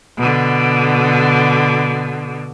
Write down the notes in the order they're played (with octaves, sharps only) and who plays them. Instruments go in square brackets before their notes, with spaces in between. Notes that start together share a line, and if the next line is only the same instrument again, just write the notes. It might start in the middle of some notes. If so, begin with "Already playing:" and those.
[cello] B2 D3